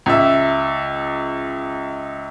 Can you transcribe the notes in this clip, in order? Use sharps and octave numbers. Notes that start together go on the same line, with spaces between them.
C#2 E5